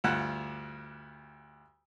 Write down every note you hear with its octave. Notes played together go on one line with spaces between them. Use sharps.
D2 G2 F4 F#5 F#6